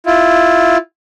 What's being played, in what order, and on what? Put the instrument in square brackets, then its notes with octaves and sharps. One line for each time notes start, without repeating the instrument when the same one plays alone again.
[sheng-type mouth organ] E4 F4